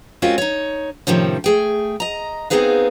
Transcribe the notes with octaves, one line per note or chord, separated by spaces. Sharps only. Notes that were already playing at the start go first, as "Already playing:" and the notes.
G#3 C4 C#4 F4 F#4 A#4
D#4 C#5
A2 C3 D#3 F3 C#4
A3 G#4 G5
D#5 A#5
B3 C4 D#4 G#4 B4 F5